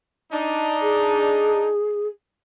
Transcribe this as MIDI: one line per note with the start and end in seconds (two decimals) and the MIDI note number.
0.33 1.70 62
0.33 1.70 63
0.81 2.07 68